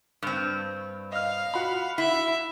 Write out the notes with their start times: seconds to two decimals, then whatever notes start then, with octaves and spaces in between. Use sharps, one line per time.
0.22 G2 C4
1.12 D#5 F5 F6
1.54 F#4 B5
1.98 E4 E5